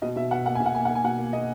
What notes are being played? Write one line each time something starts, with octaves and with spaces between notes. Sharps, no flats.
B2 D#5
B2 E5
B2 F#5
A#3 F#5
B2 G#5
F#5
A#3 G#5
A#3 F#5
G#5
B2 F#5
A#3
A#3 D#5